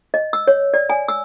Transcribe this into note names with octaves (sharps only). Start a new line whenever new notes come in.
D#5
E6
C#5
D5
G#5
E6